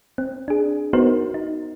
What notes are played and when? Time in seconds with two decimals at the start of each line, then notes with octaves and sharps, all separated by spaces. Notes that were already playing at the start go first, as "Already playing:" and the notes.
0.18 C4
0.48 D4 G#4
0.93 B3 D#4 F#4 A#4 C5
1.34 D#4